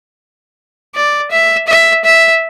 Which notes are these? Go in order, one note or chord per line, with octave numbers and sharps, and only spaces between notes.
D5
E5
E5
E5